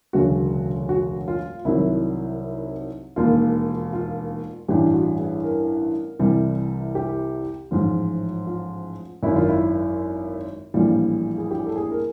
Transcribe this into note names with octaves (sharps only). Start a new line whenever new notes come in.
E1 D2 C#3 F#3 F#4
F#4
F4
C2 C3 D#3 F#3 E4
E1 D#2 D#3 F4
F4
A1 G2 E3 G3 G4
F#4
G#4
A#4
C2 C3 E3 G3
G4
A1 G#2 F3 F4
F4
G#1 F#2 D#3 E4
F4
E4
A#1 A2 E3 G3 F4
G#4
G4
A4
G#4
A#4